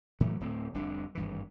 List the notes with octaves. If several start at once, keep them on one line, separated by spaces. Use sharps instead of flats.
A2 E3 F#3 A3
D1 A2 C4
F1 C2 D3 D4
G#1 G2 E3